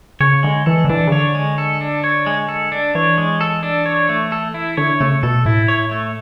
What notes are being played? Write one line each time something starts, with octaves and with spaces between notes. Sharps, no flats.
C#3 C#5
D3 G#3
E3 A4
D3
E3 D4
C#3
D3 C#5
G#3
A4
D4
C#5
G#3
A4
D4
E3 C#5
G#3
A4
D4
C#5
A3
A4
E4
D3 C#5
C#3 A3
B2 A4
A2 E4
C#5
A3